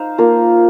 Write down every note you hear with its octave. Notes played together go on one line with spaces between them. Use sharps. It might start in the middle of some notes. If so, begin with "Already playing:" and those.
Already playing: D#4 C5 F5
A#3 F4 A#4